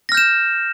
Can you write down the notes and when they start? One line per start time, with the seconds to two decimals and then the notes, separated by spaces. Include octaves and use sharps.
0.09 A#6
0.12 F6
0.15 G6
0.17 E7